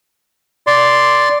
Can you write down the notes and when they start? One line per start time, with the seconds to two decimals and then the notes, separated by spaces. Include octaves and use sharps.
0.67 D5 C6